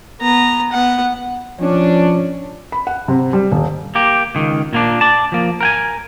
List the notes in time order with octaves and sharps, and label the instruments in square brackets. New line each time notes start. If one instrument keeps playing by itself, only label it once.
[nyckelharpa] B3 A#5
B3 F#5
[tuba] F3 [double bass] C#4 [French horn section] D4
[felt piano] B5
F#5
C3
G3
D#1
[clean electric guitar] A#3 G4
C#2 D#3
A#2 A#3 D4
D5 A5
F3 A#3
A#4 G5 G#5